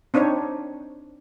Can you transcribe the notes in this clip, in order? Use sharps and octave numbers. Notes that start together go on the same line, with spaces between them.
C4 D4 D#4 C5 C#5